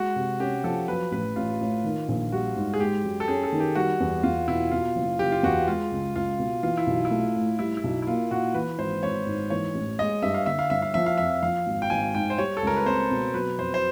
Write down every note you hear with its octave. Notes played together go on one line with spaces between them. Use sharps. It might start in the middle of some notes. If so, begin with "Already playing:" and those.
Already playing: G#3 F#4
C3
C#4 G4
F3 A4
F#3 B4
A1 B4
A1 F4
A2
D#3
A#1
G3 F#4
G#2
G#4
G#3 G4
F#2
A4
C#4 G#4
A4
D#3
G4
G3 F#4
E2
E2 F4
B2 E4
B2 F4
F#1
F#1 G4
F4
E2 F#4
G#3 F4
C#2
C#2 F4
B2
E3 F4
E4
B1
E4
A3
A2
G3 E4
E4
B1
E4
A#3 F4
A#2 F#4
E3 B4
G#1 C5
G#1 C#5
G#2
E3 C#5
A1
G#3 D#5
G2 E5
F5
D3 E5
F5
G1 E5
F5
F3 E5
F5
F2 E5
F3 F5
G#1
G5
G#1 G#5
G#2 G5
C5
G3 C#5
A4
C#2 A#4
B4
C4 C5
B2
F#3 B4
F2 C5
C5